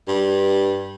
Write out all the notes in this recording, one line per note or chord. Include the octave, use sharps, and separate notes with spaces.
G2